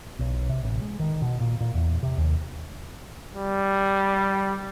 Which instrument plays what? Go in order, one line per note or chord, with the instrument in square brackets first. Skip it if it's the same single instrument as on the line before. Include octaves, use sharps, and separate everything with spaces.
[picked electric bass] B1
C3
A1
G#3
D#3
B2
A#2
A#2
E2
C3
D#2
[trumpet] G3